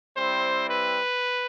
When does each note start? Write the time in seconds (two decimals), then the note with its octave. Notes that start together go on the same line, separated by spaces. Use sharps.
0.17 G3 C4 E4 C5
0.70 B4